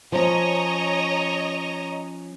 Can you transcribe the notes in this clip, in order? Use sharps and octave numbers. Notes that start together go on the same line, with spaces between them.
F3 C#4 C#5 D#5 A#5